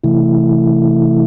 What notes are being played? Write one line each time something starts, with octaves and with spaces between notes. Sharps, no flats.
C3 E3 A3 E4